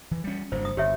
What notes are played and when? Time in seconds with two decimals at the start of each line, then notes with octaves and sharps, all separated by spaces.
0.11 E3
0.24 G3 C#4
0.52 F#1 G2 F#3 C5
0.65 D#6
0.77 G1 G4 C#5 E5